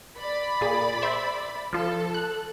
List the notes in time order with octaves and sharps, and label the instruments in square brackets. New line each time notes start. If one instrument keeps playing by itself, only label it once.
[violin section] D5 B5
[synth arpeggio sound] A#2 G#4
C5 E5
[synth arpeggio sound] F3 F4 [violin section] A4
[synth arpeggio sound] F#6